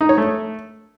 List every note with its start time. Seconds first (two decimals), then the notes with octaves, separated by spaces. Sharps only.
0.01 D#4
0.09 C#5
0.18 A3